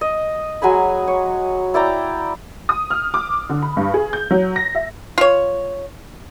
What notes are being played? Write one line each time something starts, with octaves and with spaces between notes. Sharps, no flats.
D#5
F#3 G#3 G#5 B5
C#5
E4 D5 G5 A#5
D#6
F6
D6
D3
B5
G2
G#4
G6
F#3
A#6
E5
F4 C#5